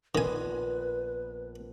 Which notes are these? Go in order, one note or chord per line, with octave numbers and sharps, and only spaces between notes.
A#1 D#3 B3 B4 G#5 C6